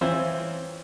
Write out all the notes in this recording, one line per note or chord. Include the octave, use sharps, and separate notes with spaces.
E3 C4 C#4 F4 C5 E5